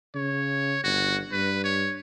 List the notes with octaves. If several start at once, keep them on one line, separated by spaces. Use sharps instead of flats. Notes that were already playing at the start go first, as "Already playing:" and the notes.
C#3 C#5
G1 F#4
G2 B4
C#5